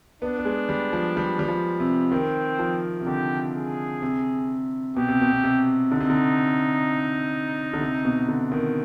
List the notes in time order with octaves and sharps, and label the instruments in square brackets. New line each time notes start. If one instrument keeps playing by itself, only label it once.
[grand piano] B3 [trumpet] D4
[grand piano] B3
G#3
G3
F3
G3
G3
F3
C3
[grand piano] D#3 [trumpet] C4
[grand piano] F3
C3
[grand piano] D3 [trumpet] G4
[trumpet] G#4
[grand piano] C3
[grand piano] B2 [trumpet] G4
[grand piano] C3
B2
B2
C3
[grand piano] D3 [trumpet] D#4
[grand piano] C3
D3
D3
C3
B2
D3
D#3